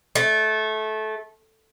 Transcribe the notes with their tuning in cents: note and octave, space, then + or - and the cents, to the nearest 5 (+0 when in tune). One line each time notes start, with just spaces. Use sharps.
A3 -20